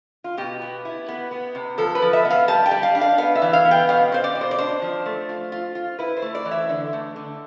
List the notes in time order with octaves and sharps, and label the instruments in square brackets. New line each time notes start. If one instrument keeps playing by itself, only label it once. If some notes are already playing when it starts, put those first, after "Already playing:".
[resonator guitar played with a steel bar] F4
B2 G4
B3
E4
B3
B3
C3
F3 A4
B4
F3
E5
B3
F5
G3 A5
G5
G3
F5
D4
F5
B3 F5
E5
E3
F5
B3
G5
B2 F5
C4 C5
D5
B2
C5
D5
D4 C5
F3
A3
F4
F4
F4
E4 B4
C5
A3
D5
E3
E5
D3
A3
D3